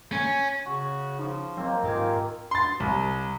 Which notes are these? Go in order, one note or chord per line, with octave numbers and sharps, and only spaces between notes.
C#4
C#3 F#4 C#6
F3 D#4
D#3 F#3 A#3 C4
G#2 D#3 F4 G4 G#4 G#5
C6 A6
C2